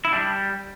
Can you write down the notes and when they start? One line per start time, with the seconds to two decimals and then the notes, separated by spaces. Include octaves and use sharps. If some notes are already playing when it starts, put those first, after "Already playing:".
0.05 E4
0.12 G3 D4